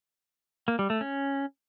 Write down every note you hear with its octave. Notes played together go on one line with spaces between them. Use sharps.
A#3
G3
A3
C#4